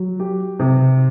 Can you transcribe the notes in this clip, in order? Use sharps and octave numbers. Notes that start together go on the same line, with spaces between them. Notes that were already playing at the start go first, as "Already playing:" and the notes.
Already playing: F#3
G4
C3